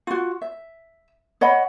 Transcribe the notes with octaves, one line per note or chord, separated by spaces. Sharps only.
F4 F#4
E5
C#5 D#5 F#5 B5